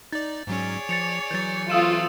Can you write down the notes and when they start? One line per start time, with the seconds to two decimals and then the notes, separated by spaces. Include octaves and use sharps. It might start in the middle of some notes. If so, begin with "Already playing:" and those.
0.13 D#4 D5 A6
0.47 G#2 F#3 C#4 G#4 C#5 D5
0.89 F3 A6 C#7 F7
1.31 E3 F#3 G6 A6
1.70 A3 C4 F4 F#4 D#6 E6 E7